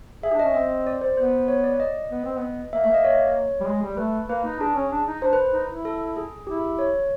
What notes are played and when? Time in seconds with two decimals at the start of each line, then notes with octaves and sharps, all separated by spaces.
0.23 G#4 E5
0.33 D4
0.39 C#4 D#5
0.54 C4 D#5
0.87 D5
1.01 C5
1.17 B3 C5
1.48 C#5
1.64 D5
1.80 D#5
2.11 B3
2.25 C4
2.38 B3
2.73 A#3 E5
2.84 A3 E5
2.88 A#3
2.94 D#5
3.04 C#5
3.61 G3
3.67 G#3
3.82 G3
3.97 A3 B4
4.29 A#3 B4
4.45 D#4
4.60 D4 G#4
4.75 C#4
4.92 D4
5.08 D#4
5.22 D4 C5
5.33 B4
5.53 D#4
5.69 E4
5.85 A4
6.17 G#4
6.47 E4 G4
6.79 C#5